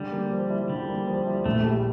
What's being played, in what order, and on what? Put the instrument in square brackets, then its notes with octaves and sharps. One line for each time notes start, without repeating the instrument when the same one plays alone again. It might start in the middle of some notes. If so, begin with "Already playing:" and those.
Already playing: [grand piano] D3 [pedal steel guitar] G3
[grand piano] A#3
F3
E4
[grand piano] D3 [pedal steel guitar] G3
[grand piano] A#3
F3
E4
[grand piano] A#1 [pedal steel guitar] A3
[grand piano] G3